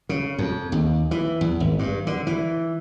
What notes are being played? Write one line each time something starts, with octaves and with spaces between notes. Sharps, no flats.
C#3
F2
D#2
E3
E2
G#1
G2
D3
E3